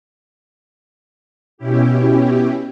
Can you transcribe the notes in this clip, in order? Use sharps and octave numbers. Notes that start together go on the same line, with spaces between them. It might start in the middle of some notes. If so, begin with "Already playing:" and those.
B2 C#4 E4 G4